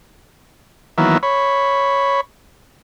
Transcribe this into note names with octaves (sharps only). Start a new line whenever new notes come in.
D#3 E3 F#3 A#3 B3 E4
C#5 B5